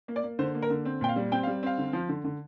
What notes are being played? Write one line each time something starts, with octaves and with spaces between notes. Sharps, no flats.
A#3
D5
A#3
D3 C5
A#3
A#4
D3
C4
A#2 G5
F5
G3
C4 G5
F5
G3
C4 F5
D3
F3
D3
D3